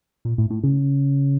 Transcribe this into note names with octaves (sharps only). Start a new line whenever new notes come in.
A#2
A2
A2
C#3